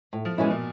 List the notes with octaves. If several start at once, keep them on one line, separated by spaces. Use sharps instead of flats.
A2
F3
B2 E3 G#3 C#4 E4
A#2